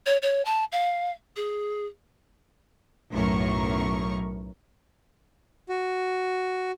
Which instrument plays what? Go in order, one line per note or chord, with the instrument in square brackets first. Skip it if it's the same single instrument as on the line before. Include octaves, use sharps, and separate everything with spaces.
[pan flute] C#5
C#5
A5
F5
G#4
[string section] B1 F#2 A2 A#4 C#6
[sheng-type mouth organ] F#4